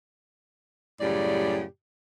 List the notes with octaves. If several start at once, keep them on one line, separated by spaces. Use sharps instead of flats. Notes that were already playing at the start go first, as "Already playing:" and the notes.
F#2 A2 C#3 G3 G4 D5